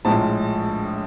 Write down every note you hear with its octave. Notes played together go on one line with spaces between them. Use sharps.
A#1 A2 F3 G#3 A5